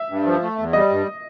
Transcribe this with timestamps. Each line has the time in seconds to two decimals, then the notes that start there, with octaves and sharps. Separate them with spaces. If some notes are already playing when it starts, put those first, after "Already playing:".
Already playing: E5
0.10 G2
0.25 F3
0.42 A3
0.58 E2
0.73 G3 D#5
0.90 G2